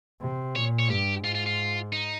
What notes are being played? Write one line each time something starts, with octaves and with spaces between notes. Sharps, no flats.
C3
A#2 C#5
C#5
G2 G4
G#2 F4
F4
F4
D#4